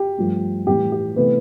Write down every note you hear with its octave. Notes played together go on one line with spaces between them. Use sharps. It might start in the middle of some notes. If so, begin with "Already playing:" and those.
Already playing: G4
G2 F3 A3
A2 E3 G3 G4
G4
C3 E3 A3 B3 B4